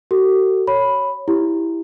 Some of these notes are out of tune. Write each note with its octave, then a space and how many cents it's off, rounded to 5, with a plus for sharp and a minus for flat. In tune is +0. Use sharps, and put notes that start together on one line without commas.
F#4 +40 A4 +40
C#5 +0 B5 +0
E4 +0 G4 +10